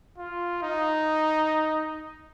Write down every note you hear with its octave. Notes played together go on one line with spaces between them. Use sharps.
F4
D#4